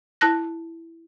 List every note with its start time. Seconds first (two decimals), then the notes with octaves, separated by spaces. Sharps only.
0.21 E4 A5 F#6 A#6